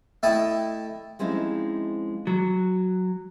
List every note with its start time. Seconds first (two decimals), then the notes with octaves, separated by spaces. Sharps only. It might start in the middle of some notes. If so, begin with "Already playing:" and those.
0.23 A3 E4 A4 D#5 G5
1.19 F3 G#3 C4 C#4 D#4 E4
2.27 F#3